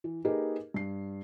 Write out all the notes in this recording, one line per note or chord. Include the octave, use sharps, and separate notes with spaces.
E3
A#3 D#4 G4 G#4 A#4 B4
G2 C7